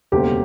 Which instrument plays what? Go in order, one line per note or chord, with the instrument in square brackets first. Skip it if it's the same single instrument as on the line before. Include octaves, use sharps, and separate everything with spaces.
[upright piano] E1 D2 C#3 G3 A#3 [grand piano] G4